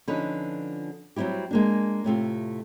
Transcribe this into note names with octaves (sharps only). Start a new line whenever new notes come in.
D3 F3 C#4 D#4 B4
F#3 G3 C4 E4 G4
G#3 A#3 D4
A2 C3 A3 F4